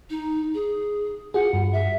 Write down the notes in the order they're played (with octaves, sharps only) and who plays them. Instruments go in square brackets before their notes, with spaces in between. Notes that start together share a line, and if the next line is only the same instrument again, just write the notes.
[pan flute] D#4
G#4
[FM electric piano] F4 F#4 G#4 [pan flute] F#5
[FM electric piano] G2
[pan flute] E5